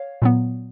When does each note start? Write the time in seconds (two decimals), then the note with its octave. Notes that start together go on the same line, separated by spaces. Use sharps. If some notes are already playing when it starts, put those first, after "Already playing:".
Already playing: C#5 F5
0.22 A#2 F#3 B3